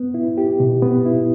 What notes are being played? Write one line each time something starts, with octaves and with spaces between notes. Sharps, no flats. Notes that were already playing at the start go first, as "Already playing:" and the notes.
Already playing: B3
E4
G4
B2
B3
E4